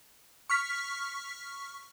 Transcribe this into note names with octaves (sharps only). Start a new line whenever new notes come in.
C#6 F6 B6